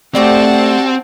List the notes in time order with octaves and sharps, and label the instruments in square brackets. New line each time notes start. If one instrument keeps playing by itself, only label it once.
[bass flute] A3 [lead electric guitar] C4 [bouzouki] F#4 G4 D5 [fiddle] F#5 A5